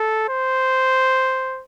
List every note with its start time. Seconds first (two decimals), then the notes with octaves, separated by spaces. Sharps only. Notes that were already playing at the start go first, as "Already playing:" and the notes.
Already playing: A4
0.29 C5